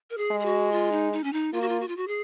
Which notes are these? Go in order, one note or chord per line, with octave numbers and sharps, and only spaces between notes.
A#4
G#4
G#3
G#4
F#4
F4
D#4
D#4
C#4
D#4
A#3 F4
F#4
F4
F#4
F4
F#4
G#4